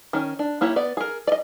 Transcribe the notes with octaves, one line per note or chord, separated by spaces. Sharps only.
D#3 C#4
D4
A#3 E4 G4 C#5
B3 D5
G#4 A#4
D5 D#5